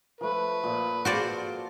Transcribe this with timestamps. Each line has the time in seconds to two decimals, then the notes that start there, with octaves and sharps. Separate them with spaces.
0.21 F3 A3 B4
0.63 A#2 F3
1.05 F4 F#4 C5 D5